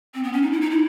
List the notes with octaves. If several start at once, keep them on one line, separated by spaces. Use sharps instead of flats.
C4
B3
C#4
D#4
E4
D#4
E4